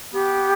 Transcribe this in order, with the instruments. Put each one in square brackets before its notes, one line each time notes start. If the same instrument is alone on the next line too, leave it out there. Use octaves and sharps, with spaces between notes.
[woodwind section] B3 G4